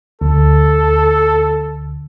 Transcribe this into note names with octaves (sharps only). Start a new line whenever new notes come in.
D2 A4